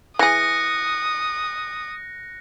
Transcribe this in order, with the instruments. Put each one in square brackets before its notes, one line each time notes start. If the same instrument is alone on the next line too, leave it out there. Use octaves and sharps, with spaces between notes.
[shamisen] E3 G#4 [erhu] D#6 [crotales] F#6 A#6 C#7